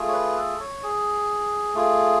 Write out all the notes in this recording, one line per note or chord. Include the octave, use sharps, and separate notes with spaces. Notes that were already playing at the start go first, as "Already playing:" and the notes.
Already playing: A3 F4 G#4
C#5
B4
A4
C#5
G#4
A3 F4 G#4